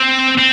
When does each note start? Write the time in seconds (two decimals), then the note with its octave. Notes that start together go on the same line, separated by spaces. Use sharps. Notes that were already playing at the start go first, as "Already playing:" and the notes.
Already playing: C4
0.38 C4